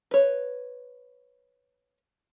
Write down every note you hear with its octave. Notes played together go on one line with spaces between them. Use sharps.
B4 C#5